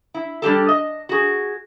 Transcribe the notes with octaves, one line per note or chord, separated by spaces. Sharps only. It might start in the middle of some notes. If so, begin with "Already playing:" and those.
E4
G3 D4 G4 A4
D#5
F#4 G#4